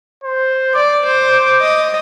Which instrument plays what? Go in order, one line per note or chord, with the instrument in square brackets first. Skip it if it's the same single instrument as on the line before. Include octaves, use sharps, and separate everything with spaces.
[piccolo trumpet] C5
[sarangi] D5 [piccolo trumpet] D6
[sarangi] C5
D#5